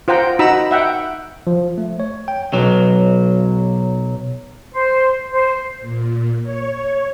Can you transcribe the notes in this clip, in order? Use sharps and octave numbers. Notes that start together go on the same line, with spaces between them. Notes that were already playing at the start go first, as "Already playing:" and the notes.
F4 C5 F#5 G5 A#5
D#4 F#4 A#5 B5 E6
E5 F#5 G5
F3
A3
C#5
G5
B1 F#3
C5
C5
A#2
C#5